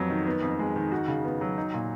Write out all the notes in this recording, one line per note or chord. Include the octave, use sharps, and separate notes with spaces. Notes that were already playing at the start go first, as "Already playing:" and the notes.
Already playing: F2 F#3 B3
D#3
B3
F2
G#3
D#3
F#4
C#3
B3
F#3
D#4
A#2